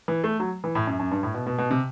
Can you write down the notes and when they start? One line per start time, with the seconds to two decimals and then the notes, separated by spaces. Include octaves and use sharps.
0.08 E3
0.24 A3
0.40 F#3
0.64 E3
0.75 A2
0.87 F#2
0.99 F#2
1.11 G2
1.23 A2
1.34 B2
1.46 B2
1.58 B2
1.71 C3